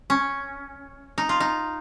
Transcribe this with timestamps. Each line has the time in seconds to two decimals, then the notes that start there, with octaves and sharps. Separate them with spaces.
0.10 C#4
1.18 D#4
1.29 F4
1.40 D#4